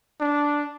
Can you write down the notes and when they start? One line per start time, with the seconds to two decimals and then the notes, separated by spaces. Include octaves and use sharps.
0.21 D4